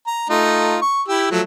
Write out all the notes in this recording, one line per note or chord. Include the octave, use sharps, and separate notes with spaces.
A#5
A3 D#4 F4
C#6
E4 G4 E6
F3 F#3 A3